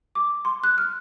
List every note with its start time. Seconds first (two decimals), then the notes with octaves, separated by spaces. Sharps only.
0.15 D6
0.45 C6
0.64 F#6
0.78 F6